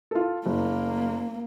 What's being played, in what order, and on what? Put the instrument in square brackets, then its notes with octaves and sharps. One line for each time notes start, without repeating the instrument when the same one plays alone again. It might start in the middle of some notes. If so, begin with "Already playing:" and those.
[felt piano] F4 A4
[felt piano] F#1 [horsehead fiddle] A#3